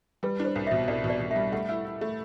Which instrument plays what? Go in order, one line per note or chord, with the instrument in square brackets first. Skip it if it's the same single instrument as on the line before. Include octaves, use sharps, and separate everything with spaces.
[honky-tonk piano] G3 [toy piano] B4
[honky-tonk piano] D4
[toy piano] C5
[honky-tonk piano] C2
[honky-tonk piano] B2 [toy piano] E5
[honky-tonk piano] C2 [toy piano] D5
[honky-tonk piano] B2
[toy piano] D5
[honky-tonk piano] B2
[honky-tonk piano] G3 [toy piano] E5
[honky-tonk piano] A3 [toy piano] F#5
[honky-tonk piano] E4
E4
A3